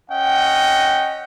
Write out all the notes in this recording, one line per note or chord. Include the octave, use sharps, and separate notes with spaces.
C#4 D#5 F#5 G5